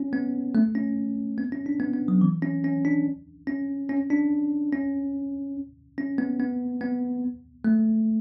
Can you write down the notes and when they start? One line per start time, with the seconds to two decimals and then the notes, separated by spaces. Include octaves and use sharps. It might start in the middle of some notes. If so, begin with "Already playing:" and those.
Already playing: C#4
0.13 B3
0.55 A3
0.75 C#4
1.38 B3
1.52 C#4
1.66 D4
1.80 B3
1.94 B3
2.08 F#3
2.21 E3
2.42 C#4
2.64 C#4
2.85 D4
3.47 C#4
3.89 C#4
4.10 D4
4.73 C#4
5.98 C#4
6.18 B3
6.40 B3
6.81 B3
7.65 A3